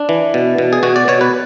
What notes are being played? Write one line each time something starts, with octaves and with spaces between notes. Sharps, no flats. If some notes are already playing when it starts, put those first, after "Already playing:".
Already playing: D4
E3
B2
B2
G#4
B2 F#4
D5
B2 C#5
B4